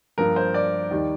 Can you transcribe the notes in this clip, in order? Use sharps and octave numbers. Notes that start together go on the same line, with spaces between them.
G2 F3 A#3 A#4
C5
D5
D#2 D#3 G3